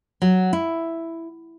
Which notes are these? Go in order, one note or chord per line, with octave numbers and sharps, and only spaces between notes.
F#3
E4